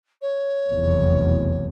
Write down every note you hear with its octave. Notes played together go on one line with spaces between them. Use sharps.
C#5
F1 B1 E2